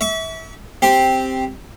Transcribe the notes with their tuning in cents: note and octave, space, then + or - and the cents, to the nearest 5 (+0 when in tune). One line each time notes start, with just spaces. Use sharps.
E5 -25 C#6 +40
C4 +0 G4 +0